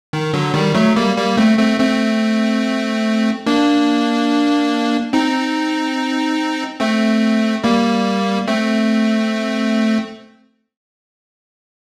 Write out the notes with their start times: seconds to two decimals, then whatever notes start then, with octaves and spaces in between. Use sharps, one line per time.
0.13 D#3
0.33 D3 F#3
0.54 D#3 G3
0.75 F#3 A3
0.96 G3 A#3
1.17 G3 A#3
1.37 A3 C4
1.58 A3 C4
1.80 A3 C4
3.46 A#3 D4
5.13 C4 D#4
6.80 A3 C4
7.64 G3 A#3
8.47 A3 C4